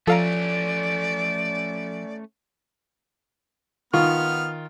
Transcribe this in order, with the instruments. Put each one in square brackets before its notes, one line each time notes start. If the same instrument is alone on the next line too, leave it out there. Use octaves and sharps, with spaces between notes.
[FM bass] F3 [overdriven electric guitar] A3 C#4 [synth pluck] A4 F5 A#5 [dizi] D5
[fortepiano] D#3 F4 C#6 [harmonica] B3 F6